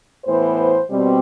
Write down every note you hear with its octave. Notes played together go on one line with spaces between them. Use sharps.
A2 E3 B3 C5
B2 G3 C4